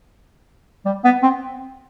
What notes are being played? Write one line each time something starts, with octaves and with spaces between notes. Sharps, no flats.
G3
B3
C4